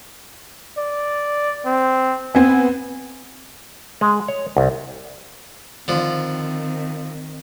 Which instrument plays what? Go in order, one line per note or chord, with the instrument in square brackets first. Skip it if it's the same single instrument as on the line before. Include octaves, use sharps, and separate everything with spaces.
[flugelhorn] D5
C4
[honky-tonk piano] B3 C4 [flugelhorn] G#5
[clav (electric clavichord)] G#3
C#5
C2
[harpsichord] D3 F3 [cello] D#3 C4